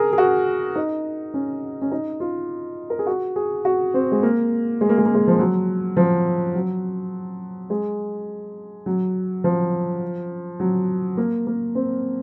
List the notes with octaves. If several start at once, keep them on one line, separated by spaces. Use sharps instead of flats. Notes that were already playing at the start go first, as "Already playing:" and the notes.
Already playing: G#4 A#4
G#4
F#4
D#4
C#4
C#4
D#4
F4
A#4
G#4
F#4
G#4
F#4
C4
G#3
A#3
G#3
A#3
G#3
A#3
G#3
F3
F#3
F3
F#3
G#3
F#3
F3
F#3
A#3
A#3
C4